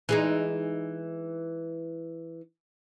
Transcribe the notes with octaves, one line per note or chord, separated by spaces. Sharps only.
E3 G#3 D#4